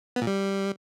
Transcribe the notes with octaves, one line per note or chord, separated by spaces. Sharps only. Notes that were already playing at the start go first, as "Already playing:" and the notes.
B3
A#2
G3